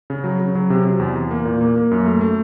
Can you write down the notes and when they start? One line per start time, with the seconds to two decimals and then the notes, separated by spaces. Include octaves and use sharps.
0.10 C#3
0.24 F#3
0.40 C#3
0.55 F#3
0.70 C3
0.85 C3
0.99 E2
1.15 E2
1.31 A#3
1.45 A#2
1.61 A#3
1.76 A#3
1.91 F#2
2.05 A3
2.21 A3